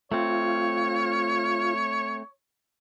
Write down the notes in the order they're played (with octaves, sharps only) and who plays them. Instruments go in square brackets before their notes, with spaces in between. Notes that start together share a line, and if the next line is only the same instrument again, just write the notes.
[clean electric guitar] A3 C4 [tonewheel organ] F4 [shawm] C#5